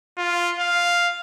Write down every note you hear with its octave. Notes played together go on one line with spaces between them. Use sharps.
F4
F5